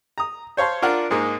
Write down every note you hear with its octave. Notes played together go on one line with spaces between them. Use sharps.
A#5 D#6
C5 C#5 F5 A5 C6
D4 F4 A#4 F#5
G#2 G#3 A#3 D#4